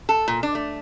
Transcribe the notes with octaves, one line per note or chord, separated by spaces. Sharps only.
A4
A#2
D4
A3